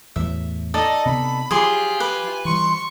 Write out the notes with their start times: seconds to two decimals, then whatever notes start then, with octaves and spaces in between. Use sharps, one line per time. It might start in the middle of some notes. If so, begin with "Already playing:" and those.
0.16 E2 A2 F#3 E5
0.74 D#4 A4 D5 D#5
1.05 C3 B3 B5
1.51 F3 F#3 F4 G4 G#4 C6 D6
2.00 B4 G#5 D6
2.45 E3 G3 C6 C#6